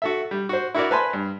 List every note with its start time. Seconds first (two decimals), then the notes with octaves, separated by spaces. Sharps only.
0.02 F#4 A4 E5
0.31 G3
0.49 F#4 C5
0.74 E4 F#4 A#4 D5
0.91 B4 C5 G#5 A5 B5 C6
1.13 G2